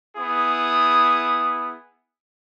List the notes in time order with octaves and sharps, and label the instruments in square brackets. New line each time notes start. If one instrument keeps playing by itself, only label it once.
[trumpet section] B3 E4 G#4 D#6